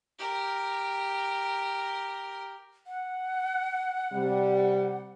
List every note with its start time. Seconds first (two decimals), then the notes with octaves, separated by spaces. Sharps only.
0.19 G4 A#4
2.87 F#5
4.13 C3 G3